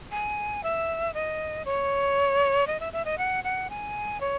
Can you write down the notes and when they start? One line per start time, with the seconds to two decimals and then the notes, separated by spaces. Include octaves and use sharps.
0.11 G#5
0.63 E5
1.14 D#5
1.65 C#5
2.67 D#5
2.80 E5
2.93 E5
3.05 D#5
3.18 F#5
3.44 F#5
3.70 G#5
4.21 C#5